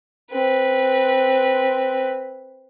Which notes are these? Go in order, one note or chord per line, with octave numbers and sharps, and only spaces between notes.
C4 B4